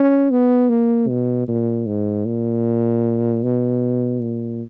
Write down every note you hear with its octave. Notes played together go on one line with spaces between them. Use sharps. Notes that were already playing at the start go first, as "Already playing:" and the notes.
Already playing: C#4
B3
A#3
B2
A#2
G#2
A#2
B2
A#2